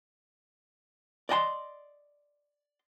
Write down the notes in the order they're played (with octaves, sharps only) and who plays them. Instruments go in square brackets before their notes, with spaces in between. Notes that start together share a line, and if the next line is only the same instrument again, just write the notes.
[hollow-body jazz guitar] D5 D#5 G5 C6